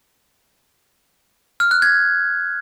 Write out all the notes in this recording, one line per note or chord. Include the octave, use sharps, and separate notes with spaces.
F6
F#6
G#6